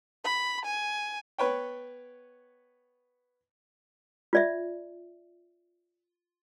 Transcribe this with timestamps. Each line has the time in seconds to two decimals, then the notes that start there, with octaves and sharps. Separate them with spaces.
0.24 B5
0.65 G#5
1.38 B3 B4 C#5 G5
4.33 F4 D5 E5